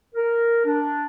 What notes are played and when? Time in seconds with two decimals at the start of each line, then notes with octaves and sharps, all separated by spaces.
0.15 A#4
0.65 D4